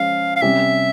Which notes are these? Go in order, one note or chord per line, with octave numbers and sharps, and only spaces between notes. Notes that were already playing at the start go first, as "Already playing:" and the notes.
Already playing: F3 G#3 C#4 F4 F5
F5
C3 G3 C#4 G4 E5